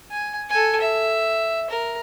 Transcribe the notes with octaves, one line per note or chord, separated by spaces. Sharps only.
G#5
A4 G#5
E5
A#4